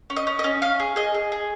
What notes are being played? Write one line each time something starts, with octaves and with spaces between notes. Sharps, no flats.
C#4
D#5
C#4
D#5
C#4
C#4 F5
G#4
G#4 D#5
G#4
G#4